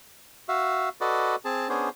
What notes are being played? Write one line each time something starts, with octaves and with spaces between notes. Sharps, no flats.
F#4 E5 F5
F#4 A4 B4 D5 D#5
C4 G#4 A5
B3 C#4 D4 G#4 C5